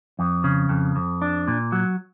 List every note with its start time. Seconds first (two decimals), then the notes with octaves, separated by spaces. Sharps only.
0.19 F2
0.44 C#3
0.69 F2
0.96 F2
1.22 D4
1.48 A#2
1.72 F#3